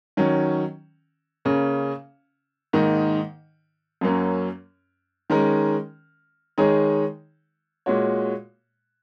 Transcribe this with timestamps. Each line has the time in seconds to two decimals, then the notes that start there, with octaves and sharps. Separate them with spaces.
0.17 D#3 F#3 C#4
1.45 C#3 A#3 C#4
2.73 G#2 D#3 A#3 D#4
4.01 F#2 F#3 A#3 C#4
5.30 D#3 G#3 C#4 A#4
6.58 D#3 G#3 D#4 G#4 C#5
7.86 A#2 G#3 F#4 C#5